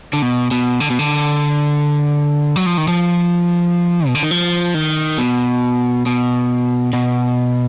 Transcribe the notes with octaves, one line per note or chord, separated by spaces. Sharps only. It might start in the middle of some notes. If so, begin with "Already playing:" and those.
D3
B2
B2
D3
B2
D3
F#3
F3
D#3
F3
B2
D3
D#3
F3
D#3
B2
B2
B2